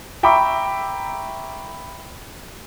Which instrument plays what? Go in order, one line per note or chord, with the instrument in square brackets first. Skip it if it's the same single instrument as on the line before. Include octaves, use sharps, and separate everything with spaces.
[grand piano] E5 G5 A#5 B5 C#6 D6